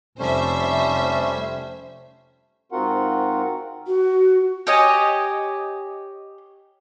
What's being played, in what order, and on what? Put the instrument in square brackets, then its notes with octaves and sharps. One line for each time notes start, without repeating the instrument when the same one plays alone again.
[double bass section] F1 [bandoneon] G3 A3 C#4 [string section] C5 E5
[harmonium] G#2 C4 F4 F#4 A#4 F#5
[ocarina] F#4
[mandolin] G4 C#5 D#5 G#5